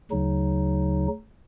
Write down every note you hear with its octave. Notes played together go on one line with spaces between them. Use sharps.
D2 C#3 F#3 D#4